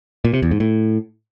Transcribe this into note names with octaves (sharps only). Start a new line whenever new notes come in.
A#2
C3
E2
G#2
A2